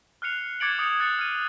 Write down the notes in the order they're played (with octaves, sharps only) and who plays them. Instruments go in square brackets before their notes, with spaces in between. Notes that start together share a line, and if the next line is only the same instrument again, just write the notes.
[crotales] F6 F#6 C7 C#7 F7
D6 G#6 A6 C#7 D7 F#7
D6 D#6 G6 C#7 D7 F7
E6 F#6 G#6 A6 C#7 D7
F6 D#7